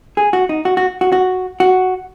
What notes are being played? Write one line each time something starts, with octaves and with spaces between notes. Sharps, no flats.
G#4
F#4
D#4
F#4
F#4
F#4
F#4
F#4